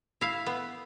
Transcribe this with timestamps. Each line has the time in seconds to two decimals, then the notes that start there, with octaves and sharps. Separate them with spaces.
0.21 E4 F5
0.46 B3